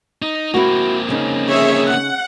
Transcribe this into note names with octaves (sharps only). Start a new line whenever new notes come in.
D#4
A#3 C4 E4 F#4
C#3 C#4 D#4
G#4 C#5 E5
F#5